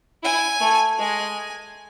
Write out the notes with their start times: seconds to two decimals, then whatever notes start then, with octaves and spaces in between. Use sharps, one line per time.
0.23 E4 G#5
0.61 A3
0.99 G#3 G#5